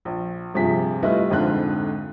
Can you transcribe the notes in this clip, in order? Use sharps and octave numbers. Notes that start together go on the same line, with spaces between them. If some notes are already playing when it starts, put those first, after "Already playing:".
A#1
A#1 G2 C3 F3 G#4 B6
G3 A3 E4 F4 B4 D#5
A#1 F2 G#2 D3 F4 F#6